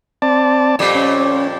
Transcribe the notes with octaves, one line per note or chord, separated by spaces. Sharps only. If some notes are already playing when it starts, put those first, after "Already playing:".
C4 D5 A5
F2 A#2 G3
C#4